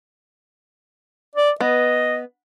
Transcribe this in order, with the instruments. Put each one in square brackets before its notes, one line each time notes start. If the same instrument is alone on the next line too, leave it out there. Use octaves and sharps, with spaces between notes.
[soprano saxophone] D5
[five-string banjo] B3 [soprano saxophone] D#5